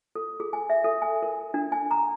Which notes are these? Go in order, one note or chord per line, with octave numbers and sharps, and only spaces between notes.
A4
G#4
G#5
E5
A4
G#5
A#4
D4
G#5
A#5